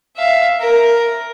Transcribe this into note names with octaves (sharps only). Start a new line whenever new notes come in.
E5 F5
A#4